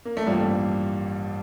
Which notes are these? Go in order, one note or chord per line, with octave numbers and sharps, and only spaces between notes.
A#3
A3
A1 G2 F3 G3 A#3